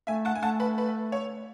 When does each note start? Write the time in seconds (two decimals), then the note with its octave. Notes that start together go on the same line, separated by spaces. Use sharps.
0.07 A3 E5 G#5
0.25 F#5 A5
0.35 G#5
0.42 A3 F#5 A5
0.60 B4
0.78 B4
1.12 C#5